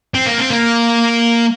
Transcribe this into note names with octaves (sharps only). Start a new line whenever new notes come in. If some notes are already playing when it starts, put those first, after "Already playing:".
C4
A#3
C4
A#3